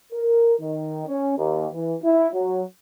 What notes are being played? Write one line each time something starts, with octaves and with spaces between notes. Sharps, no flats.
A#4
D#3
C#4
D#2
E3
E4
F#3